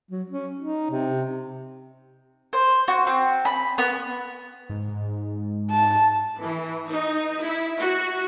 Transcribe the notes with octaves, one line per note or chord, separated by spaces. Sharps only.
F#3
C#4
D#4
C3
C5
F#4
C4
B5
B3
G#2
A5
E3
D#4
E4
F#4